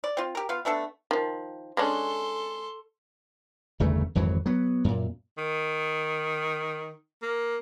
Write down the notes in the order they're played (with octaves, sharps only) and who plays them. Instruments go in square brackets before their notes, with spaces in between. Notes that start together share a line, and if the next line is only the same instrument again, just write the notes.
[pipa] D5
C4 F4
G4 A#4
B3 F4 F5
A3 B3 D4 A4
[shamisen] D#3 F3
[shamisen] G#3 C#4 D4 [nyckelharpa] A4 C6
[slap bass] G1 E2 C#3 A3
G#1 F2 E3 F#3
F#3 B3
F#2 A#2
[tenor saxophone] D#3
A#3